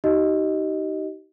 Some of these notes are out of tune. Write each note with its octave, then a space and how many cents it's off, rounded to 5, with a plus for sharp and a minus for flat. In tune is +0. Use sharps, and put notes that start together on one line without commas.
D#4 +10 G4 -35 D#5 +0